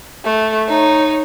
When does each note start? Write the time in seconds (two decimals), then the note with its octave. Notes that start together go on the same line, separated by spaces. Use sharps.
0.25 A3
0.68 D#4 C#5